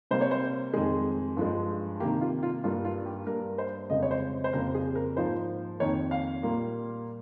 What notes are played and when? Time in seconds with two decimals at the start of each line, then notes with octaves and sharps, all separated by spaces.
0.11 C3 G3 A#3 C5
0.21 C#5
0.31 C5
0.74 F2 D#3 G#3 G#4
1.37 G2 F3 G#3
2.00 C3 D#3 A#3 G4
2.21 F4
2.43 F4
2.64 G2 G3 A#3 F4
2.85 F4
3.06 G4
3.27 G2 G3 A#3 A#4
3.58 C5
3.90 F2 C#3 G#3 D#5
4.03 C#5
4.11 C5
4.44 C5
4.53 F2 C#3 G3 A#3 A#4
4.75 G#4
4.95 A#4
5.17 G#2 F3 A#3 C5
5.80 F2 D#3 A#3 C#5
6.11 F5
6.43 A#2 G3 A#3